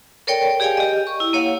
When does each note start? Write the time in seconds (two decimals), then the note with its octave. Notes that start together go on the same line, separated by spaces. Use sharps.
0.27 A4 A#4 C#5 D5 G5
0.60 G4 G#4 D5 F5 G5 G#5
0.77 G4 D#5
1.07 C#6
1.20 E4
1.33 A#3 C#5 F5 F#5